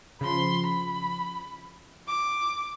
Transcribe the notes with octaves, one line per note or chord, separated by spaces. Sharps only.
C#3 F3 B5 C6
B5
D6